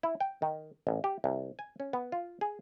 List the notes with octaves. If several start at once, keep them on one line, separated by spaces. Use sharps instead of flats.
E4
G5
D#3
A1
G4
C2
G#5
C#4
B3
F4
G#4